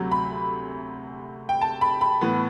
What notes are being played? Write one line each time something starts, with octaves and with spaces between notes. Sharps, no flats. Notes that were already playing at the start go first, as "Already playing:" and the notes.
Already playing: D2 C3 F#3
B5
G5
A5
B5
B5
A2 E3 B3